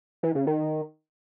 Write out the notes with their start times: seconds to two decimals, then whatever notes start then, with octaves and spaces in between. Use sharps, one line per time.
0.23 E3
0.35 C#3
0.47 D#3